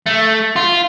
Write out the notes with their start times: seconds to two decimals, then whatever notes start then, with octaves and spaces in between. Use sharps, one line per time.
0.06 A3
0.56 F4